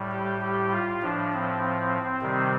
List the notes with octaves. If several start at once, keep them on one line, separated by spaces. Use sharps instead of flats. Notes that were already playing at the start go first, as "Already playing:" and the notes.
Already playing: A2 G3
G4
G4
F4
A2 F3 D4
C4
C3 D#3 G3